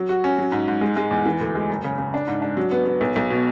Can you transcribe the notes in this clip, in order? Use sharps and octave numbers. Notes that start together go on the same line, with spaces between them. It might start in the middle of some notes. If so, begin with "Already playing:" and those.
Already playing: F#3
F#4
C#4
F#3
G#2
G#2
G#3
G#3
E2
E3
D2
G#3
F#1
C#3
C#3
D4
G#2
D4
F#3
B3
B3
B1
B1
B2